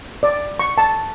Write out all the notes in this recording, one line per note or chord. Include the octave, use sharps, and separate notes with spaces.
D5
C#6
A5